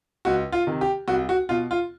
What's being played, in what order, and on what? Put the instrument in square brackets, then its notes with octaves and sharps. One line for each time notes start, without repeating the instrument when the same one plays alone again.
[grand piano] C#2 F#4
F4
C3 D#3
G4
C2 F#4
F#4
B2 F4
F4